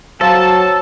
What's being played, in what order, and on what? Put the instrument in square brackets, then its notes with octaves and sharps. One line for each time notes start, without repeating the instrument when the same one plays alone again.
[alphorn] F#3 [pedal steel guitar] A4 [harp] C5 C#5 F5 [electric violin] A5